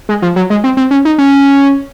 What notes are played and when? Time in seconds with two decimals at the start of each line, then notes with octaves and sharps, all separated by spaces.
0.09 G#3
0.22 F3
0.36 F#3
0.50 G#3
0.64 C4
0.77 C4
0.91 C#4
1.05 D#4
1.18 C#4